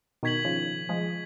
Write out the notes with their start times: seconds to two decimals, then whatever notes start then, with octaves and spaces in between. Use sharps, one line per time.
0.23 B2 D#3 C#6 G#6 B6 F#7
0.45 C#3 F3
0.89 F3 G#3